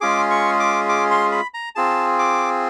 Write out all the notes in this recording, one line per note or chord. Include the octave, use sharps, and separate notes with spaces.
G#3 C#4 F4 G#4 D6
C#6
D6
D6
C6
B5
A#5
C4 F4 G#4 A5
D6